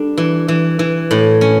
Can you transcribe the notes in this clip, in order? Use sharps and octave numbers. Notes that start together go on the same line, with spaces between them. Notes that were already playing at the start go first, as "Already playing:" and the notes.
Already playing: G3 D4 A4
E3
E3
E3
A2
C#4